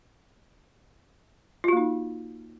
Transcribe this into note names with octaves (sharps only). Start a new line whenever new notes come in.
A#3 D#4 F4 F#4